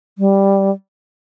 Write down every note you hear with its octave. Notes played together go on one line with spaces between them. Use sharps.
G3